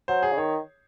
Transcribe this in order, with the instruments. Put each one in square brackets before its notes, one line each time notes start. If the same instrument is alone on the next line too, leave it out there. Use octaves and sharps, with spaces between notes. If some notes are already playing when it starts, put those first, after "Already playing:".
[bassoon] F#3 [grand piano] C5
[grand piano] G#4
[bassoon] C#3
[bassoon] D#3 [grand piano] C#5